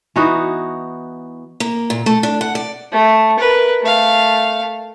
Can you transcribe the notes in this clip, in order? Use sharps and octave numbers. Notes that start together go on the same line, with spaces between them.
E3 B3 D#4 F#4
A#3
A#2
A3
D4
F#5
D5
A3
A#4 B4
A3 F5